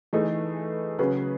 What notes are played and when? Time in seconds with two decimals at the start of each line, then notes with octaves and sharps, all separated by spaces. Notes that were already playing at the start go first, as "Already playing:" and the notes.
0.13 E3 A3 D#4 G#4 B4
0.99 C#3 F#3 C#4 G#4 B4